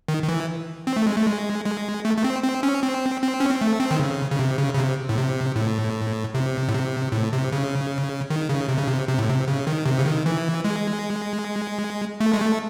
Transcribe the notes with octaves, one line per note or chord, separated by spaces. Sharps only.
D#3
D#3
E3
C4
A3
G#3
A3
G#3
G#3
A3
A3
C4
C4
C#4
C4
C4
C#4
C4
A3
C4
D#3
C#3
C#3
C3
C#3
C#3
C3
A2
C3
A2
C3
A2
C3
A2
C3
C#3
D#3
C#3
C3
C#3
C3
C3
A2
C3
C#3
D#3
C3
C#3
D#3
E3
G#3
A3
G#3
A3